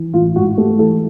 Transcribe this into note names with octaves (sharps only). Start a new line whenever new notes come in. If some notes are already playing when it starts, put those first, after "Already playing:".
Already playing: E3
A1 F4
G#2 F#4
A3 G4
E3 A4